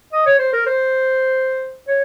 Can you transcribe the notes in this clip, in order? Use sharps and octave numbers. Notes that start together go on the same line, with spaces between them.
D#5
C#5
C5
A#4
C5
C#5